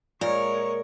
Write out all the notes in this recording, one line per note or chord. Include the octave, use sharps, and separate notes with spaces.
A#2 G#3 A#4 C#5